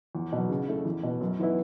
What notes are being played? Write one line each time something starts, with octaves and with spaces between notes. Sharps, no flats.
E2
B2 F#3
C#3
A3 E4 A4
E2
B2 B3
F#2
E3 B3 E4